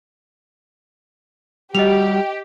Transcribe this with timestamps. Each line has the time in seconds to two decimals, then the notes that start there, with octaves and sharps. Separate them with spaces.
1.75 G3 F#4 G4 D#5 F7